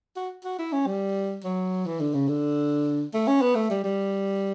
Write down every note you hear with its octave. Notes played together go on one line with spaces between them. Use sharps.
F#4
F#4
E4
C#4
G3
F#3
E3
D3
C#3
D3
A3
C#4
B3
A3
G3
G3